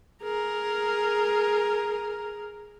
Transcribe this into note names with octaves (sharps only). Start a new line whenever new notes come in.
G#4 A#4